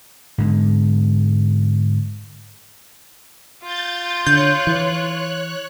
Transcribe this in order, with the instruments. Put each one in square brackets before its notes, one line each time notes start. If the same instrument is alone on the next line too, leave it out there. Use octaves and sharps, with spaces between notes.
[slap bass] G#2 D3 G#3
[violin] F4 [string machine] G6 A6
[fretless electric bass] D3 [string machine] C#5 F#6 [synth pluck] G6
[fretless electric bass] E3